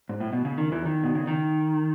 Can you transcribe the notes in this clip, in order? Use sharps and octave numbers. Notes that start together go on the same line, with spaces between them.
G#2
A2
B2
C#3
D#3
E2 E3
D#3
B2
C#3
D#3